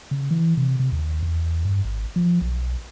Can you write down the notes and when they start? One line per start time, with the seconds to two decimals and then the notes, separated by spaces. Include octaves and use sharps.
0.11 C#3
0.31 E3
0.57 C3
0.80 C3
0.92 D#2
1.23 E2
1.65 G2
1.85 G#1
2.16 F3
2.41 B1